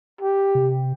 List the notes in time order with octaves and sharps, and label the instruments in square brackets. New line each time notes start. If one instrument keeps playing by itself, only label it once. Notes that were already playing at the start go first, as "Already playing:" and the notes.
[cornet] G4
[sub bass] C3